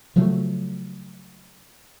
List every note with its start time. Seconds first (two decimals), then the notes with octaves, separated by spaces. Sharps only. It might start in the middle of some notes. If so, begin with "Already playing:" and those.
0.16 C#3 F3 F#3 A3